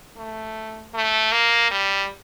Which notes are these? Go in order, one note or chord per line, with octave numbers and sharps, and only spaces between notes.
A3
A3
A#3
G3